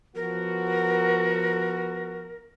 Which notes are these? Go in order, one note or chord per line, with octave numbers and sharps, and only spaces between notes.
F3 B3 F#4 A#4